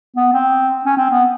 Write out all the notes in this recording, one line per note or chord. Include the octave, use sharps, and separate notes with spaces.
B3
C4
C#4
C4
B3